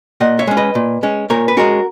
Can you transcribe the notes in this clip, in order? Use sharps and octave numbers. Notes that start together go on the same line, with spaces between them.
A#2 D#5 F#5
C#5 E5
G#3 C#4
B4 D#5
A#2
G#3 C#4
A#2 A#4 C#5
B4
G#3 C#4 F#4 A#4